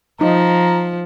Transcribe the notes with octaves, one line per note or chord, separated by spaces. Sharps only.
F3 D#4 A#5